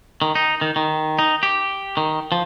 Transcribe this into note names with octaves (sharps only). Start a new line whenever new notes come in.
D#3
D#4
D#3
D#3
D#4
G4
D#3
F3